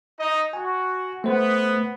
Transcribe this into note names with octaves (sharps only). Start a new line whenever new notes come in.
D#4 D#5
F#4 G#5
A3 B3 C5